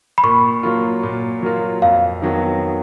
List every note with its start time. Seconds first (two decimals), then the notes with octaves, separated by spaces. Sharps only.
0.18 B5
0.23 A#2 C#6
0.63 F#3 A#3 F4
1.03 A#2
1.42 F#3 A#3 F4
1.82 F2 F5
2.22 D#3 F#3 B3 F#4